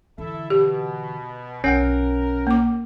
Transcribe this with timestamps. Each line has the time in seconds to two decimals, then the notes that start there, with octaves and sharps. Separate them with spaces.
0.18 D3 E3 E4 A4 E5
0.50 B2 G4
1.64 B1 C#4 F4 A#4 F#5 G5
2.47 A#3 D6